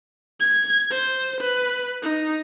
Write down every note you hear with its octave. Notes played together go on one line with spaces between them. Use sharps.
G#6
C5
B4
D#4